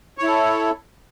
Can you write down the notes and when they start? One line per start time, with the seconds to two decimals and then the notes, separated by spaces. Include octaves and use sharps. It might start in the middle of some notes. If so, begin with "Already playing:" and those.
0.18 C#5
0.23 E4
0.28 A4